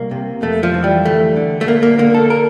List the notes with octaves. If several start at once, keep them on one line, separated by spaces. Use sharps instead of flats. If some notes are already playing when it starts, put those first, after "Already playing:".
Already playing: C2 A#3
C3
F2 A3
F3
E3
G3
D2 A3
D3
A3
D2 A#3
A#3
D3 A#3
A4
A#4